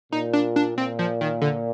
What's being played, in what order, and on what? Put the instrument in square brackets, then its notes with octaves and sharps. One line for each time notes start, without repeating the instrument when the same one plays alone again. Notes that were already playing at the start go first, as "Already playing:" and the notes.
[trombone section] A#2 [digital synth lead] D#4
[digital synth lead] D4
D4
[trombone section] A#2 [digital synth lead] C4
[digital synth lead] F3
D#3
D3